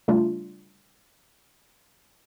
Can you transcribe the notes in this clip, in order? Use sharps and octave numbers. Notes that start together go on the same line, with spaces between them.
C#3 G3 A3 D4 F4